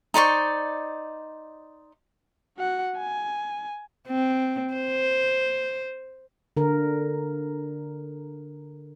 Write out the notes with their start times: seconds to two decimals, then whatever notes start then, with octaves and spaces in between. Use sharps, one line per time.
0.14 D#4 C5 D5 C#6
2.57 F#4 F#5
2.98 G#5
4.08 C4
4.74 C5
6.57 D3 A#4